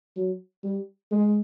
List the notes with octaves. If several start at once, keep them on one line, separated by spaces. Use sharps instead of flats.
F#3
G3
G#3